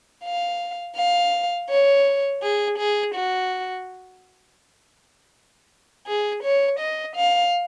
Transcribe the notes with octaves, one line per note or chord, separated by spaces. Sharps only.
F5
F5
C#5
G#4
G#4
F#4
G#4
C#5
D#5
F5